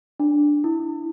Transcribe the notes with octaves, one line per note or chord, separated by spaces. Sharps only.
D4
E4